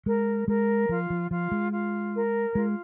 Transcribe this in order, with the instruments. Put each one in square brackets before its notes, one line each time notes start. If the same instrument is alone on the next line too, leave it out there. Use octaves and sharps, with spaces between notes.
[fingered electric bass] G#3 [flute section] A#4
[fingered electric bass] G#3 [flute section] A#4
[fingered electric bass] F3 [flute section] F4
[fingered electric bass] F3
[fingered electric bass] F3 [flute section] F4
[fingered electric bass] G#3
[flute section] F4
A#4
[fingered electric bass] G#3 [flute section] F4